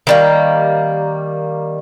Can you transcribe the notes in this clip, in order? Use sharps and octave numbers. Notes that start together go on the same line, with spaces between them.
D#3 G3 A#3